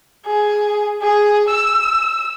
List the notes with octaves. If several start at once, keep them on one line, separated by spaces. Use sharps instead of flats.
G#4
G#4
E6